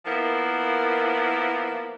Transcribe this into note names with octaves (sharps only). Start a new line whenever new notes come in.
F3 A#3 B3 E4 A#4